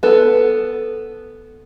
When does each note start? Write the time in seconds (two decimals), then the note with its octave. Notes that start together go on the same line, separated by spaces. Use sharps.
0.03 B3 A4